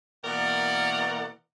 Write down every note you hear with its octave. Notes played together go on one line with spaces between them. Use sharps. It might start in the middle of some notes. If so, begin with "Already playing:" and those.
B2 E3 A#3 A#4 D5 F#5